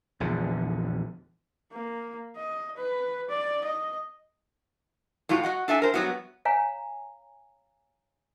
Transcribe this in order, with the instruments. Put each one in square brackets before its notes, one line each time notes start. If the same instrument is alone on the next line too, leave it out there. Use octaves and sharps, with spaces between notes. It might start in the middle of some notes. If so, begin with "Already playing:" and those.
[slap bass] A#1 E2 D3
[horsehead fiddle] A#3
D#5
B4
D5
D#5
[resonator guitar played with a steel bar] A2 G3 F4 F#4
F#4 D#5 F#5
D4 A4 E5 G#5
A#4 C5
F#3 G3 B3 E4 F#4
[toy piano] C#5 F5 G#5 A#5